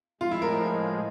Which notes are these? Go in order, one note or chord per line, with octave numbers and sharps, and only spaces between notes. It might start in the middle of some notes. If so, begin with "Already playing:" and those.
A2 F3 G#3 F4
E4
A#4